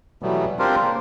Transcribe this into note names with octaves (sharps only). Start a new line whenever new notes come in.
B2 E3 F#3 G3 A3 B3
C4 D4 F4 G4 A#4 C5
C#3 A#3